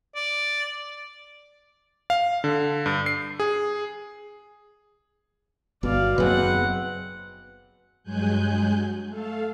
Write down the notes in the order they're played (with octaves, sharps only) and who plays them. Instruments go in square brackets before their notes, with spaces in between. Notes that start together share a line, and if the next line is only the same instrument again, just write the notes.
[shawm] D5
[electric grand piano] F5
D3
G2
C7
G#4
[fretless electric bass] G1 [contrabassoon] B2 [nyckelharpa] D5 F5
[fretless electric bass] F#1 F#3 [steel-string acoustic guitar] D#2 G#4 B4 [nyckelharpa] C4 F#5
[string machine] G2 F#3 G#3 G#5 F#6 G6
A3 A4 F5